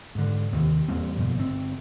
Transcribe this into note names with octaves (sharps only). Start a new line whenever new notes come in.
G#2 D3
D#2 C3
E2 G3 A#3 C4
G2 B2 F3 A#3
G1 C#3 C4